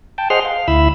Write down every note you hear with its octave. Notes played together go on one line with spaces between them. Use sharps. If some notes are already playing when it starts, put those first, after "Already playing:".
G5 A5
G#4 C5 D#5 F#5 C6 F6
F5
D2 E4 B5 E6